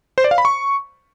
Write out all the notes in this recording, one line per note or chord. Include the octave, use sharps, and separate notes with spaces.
C5
D5
F5
B5
C#6